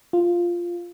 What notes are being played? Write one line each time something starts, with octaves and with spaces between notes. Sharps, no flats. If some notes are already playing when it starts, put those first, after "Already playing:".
F4